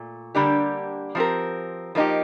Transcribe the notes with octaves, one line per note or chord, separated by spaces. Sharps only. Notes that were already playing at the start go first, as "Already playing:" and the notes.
Already playing: A#2 A3
D3 G3 A#3 D4 G4
F3 C4 G4 A#4
F3 A#3 D#4 G4